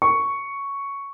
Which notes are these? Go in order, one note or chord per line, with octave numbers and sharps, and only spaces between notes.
C#6